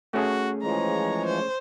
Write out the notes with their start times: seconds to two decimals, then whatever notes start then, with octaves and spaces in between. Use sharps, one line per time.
0.14 A3 C#4 F#4 G#4
0.62 E3 F3 G#3 C#5 A#5
1.26 C5